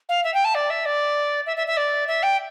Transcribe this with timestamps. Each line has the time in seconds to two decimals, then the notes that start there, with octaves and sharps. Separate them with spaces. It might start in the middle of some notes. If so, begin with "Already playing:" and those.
0.08 F5
0.24 E5
0.34 G5
0.44 A5
0.54 D5
0.70 E5
0.85 D5
1.46 E5
1.56 E5
1.67 E5
1.76 D5
2.07 E5
2.22 G5